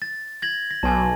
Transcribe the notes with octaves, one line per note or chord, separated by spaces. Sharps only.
A6
G#6 A#6 F#7
A#6
B1 G#5 A5